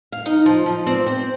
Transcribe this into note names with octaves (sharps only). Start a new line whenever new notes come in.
F5
D#4 D#5
F3
F3
C4 D5
C4 C5